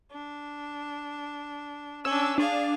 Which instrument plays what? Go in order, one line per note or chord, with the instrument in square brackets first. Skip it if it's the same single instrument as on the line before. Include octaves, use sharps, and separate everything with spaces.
[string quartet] D4
[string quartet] C#4 D4 [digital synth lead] E6
[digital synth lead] D4 [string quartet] G#4 F5